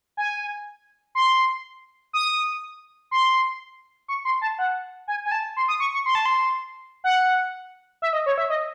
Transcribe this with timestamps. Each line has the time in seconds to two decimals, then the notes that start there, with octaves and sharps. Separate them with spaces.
0.17 G#5
1.15 C6
2.13 D#6
3.11 C6
4.08 C#6
4.25 C6
4.42 A5
4.59 F#5
5.08 G#5
5.25 G#5
5.32 A5
5.57 C6
5.68 D#6
5.80 C#6
5.94 C#6
6.06 C6
6.15 A5
6.26 C6
7.04 F#5
8.02 E5
8.13 D#5
8.26 C#5
8.38 E5
8.50 D#5